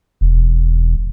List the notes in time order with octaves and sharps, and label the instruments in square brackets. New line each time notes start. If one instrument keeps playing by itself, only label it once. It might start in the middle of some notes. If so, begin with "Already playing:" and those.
[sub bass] E1